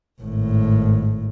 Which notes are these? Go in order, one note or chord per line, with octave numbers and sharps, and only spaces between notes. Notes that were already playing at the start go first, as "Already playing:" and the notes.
G#1 A2